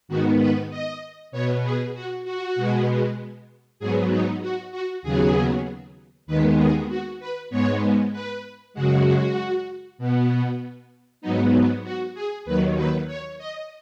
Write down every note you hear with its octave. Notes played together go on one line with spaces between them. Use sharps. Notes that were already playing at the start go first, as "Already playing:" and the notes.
G#2 D#3 B3 F#4
B4
D#5
B2 B3 C#5
G#4
F#4
F#4
B2 G#3 B3
G#2 F#3 B3 G#4
D#4
F#4
F#4
D#2 C#3 F#3 B3 G#4
D#2 D#3 G#3 B3 B4
G#4
F#4
B4
G#2 G#3 B3 C#5
B4
F#2 C#3 G#3 F#4
B2 B3
G#2 F#3 B3 D#4
F#4
G#4
D#2 D#3 F#3 B4
B4
C#5
D#5